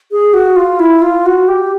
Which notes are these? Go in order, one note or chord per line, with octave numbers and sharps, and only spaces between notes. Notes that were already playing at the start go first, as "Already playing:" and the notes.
G#4
F#4
F4
E4
F4
F#4
G4